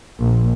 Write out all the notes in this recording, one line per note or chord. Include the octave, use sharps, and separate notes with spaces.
A#1